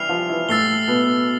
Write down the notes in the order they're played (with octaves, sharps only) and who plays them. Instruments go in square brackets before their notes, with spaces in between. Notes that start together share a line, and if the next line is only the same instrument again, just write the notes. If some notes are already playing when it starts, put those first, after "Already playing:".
Already playing: [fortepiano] E3 G3 E4 G4 [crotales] F6 C7 F7
[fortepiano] F3 F4
E3 E4
[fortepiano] A2 A3 [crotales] E6 A6 C7 G7
[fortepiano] B2 B3